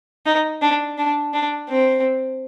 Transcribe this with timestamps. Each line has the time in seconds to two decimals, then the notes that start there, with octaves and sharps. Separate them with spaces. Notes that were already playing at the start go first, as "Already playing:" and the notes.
0.26 D#4
0.62 D4
0.98 D4
1.34 D4
1.70 C4